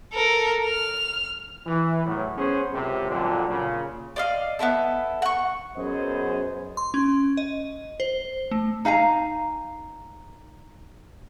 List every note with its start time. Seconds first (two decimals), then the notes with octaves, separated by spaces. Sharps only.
0.13 A4 A#4
0.65 F6
1.66 E3
2.06 E2 A2 F#3
2.37 B3 C#4 G#4 C5
2.73 C#2 F#2 C3
3.10 F2 A#2 D3 F#3
3.48 A#2 C#3
4.16 D5 D#5 F5
4.59 B3 C#4 E4 A4
5.22 F#5 C#6
5.76 F#2 B3 G#4 C5 D#5
6.77 C6
6.94 C#4
7.37 D#5
8.00 C5
8.51 A3
8.85 D#4 F5 G#5 A#5